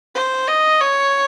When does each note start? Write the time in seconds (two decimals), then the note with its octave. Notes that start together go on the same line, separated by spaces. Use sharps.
0.15 C5
0.48 D#5
0.80 C#5